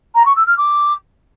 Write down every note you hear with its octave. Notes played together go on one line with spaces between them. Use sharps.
A#5
C#6
E6
F6
D6